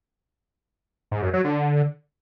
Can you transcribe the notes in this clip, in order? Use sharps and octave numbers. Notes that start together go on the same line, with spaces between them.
G#2
F#2
F#3
D3